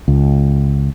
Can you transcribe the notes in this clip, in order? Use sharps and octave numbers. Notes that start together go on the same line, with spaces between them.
C#2